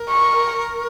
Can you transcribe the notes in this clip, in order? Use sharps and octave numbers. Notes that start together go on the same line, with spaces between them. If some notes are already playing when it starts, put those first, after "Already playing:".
Already playing: A#4
C#6